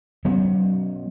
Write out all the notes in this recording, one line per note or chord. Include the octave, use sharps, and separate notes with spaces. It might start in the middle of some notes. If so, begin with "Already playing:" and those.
F#3 B3 C#4